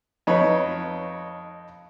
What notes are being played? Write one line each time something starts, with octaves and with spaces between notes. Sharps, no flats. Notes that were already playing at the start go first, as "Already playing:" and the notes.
F2 D#4 B4 C#5